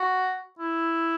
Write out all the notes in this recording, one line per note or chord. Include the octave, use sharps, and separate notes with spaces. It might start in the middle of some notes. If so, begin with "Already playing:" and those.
Already playing: F#4
E4